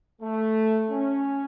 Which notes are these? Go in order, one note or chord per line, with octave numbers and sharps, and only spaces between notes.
A3
C#4